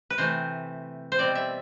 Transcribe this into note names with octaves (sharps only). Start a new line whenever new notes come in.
B4
C3 E3 A3 C5
C5
B2 G3 C4 D5
E5